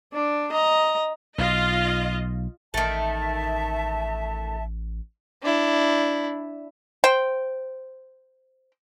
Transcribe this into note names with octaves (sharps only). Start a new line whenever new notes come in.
D4 D5
D#5 A#5
B1 F4 D#5
A1 D#3 A3 E5 A5
D4 E4
C5 G5